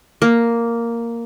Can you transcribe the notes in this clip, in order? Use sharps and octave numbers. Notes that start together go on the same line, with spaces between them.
A#3